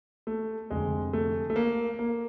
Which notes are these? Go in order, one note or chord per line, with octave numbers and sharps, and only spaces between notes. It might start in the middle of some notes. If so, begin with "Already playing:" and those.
A3
F1 F2 D3 G#3
A3
A3
A#3
A#3